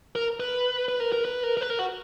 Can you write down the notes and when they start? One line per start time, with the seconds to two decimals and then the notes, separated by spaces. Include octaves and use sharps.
0.15 A#4
0.40 B4
0.89 B4
1.00 A#4
1.12 A#4
1.25 B4
1.43 A#4
1.57 A#4
1.61 B4
1.70 A#4
1.79 F#4